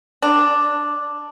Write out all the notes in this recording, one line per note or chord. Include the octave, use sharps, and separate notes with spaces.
D4